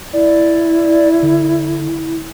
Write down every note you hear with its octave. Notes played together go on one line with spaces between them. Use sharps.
E4 D5
D3